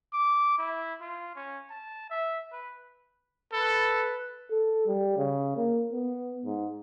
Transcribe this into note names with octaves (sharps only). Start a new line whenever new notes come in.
D6
E4
F4
C#4
A5
E5
B4
A4 B4
A4
G3
C#3
A#3
B3
G#2